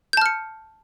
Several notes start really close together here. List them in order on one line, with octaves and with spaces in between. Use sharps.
G6 A5 F6 C#7